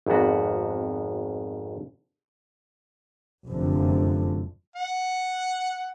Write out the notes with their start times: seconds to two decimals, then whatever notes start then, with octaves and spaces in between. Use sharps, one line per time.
0.06 G#1 F2 G#2 B3 F#4
3.46 F1 F#2 D3 F3
4.76 F#5